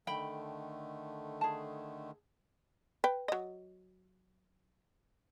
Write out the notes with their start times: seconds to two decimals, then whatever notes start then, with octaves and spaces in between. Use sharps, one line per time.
0.07 D3 D#3 A3 G5 B5
1.41 G#4 A5
3.04 B4 G5
3.28 F#3 D#5